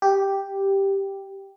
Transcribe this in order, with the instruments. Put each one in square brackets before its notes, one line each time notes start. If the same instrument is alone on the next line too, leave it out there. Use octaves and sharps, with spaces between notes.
[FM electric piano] G4